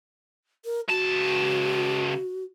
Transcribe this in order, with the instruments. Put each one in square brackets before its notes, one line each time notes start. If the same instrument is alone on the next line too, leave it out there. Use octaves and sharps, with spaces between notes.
[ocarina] A#4
[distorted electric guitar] C#2 A5 [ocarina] F#4